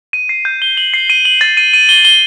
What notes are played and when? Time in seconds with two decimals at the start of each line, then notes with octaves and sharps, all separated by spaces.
0.13 D#7
0.29 C7
0.45 G6
0.62 G7
0.77 F#7
0.94 C7
1.10 D#7
1.25 F#7
1.41 A6
1.57 D#7
1.74 D#7
1.89 G7
2.05 G7